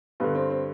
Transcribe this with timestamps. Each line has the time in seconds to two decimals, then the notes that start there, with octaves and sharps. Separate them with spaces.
0.20 G2 D3 B3
0.35 C4
0.50 C4